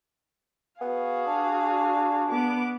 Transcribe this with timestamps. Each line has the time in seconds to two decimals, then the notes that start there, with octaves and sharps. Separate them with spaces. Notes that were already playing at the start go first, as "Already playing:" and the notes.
0.81 B3 F#4 G#4 F5
1.27 D4
2.28 B3 D6